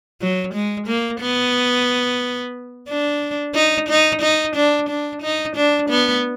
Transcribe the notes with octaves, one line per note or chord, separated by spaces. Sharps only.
F#3
G#3
A#3
B3
D4
D#4
D#4
D#4
D4
D4
D#4
D4
B3